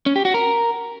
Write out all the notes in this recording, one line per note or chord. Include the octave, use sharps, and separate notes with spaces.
C#4
G4
F#4
A#4